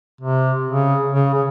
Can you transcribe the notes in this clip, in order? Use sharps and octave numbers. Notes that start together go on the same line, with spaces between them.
C3
C#3
C#3
C#3